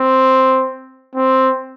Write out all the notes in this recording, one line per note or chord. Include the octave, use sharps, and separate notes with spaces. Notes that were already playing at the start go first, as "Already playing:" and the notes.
Already playing: C4
C4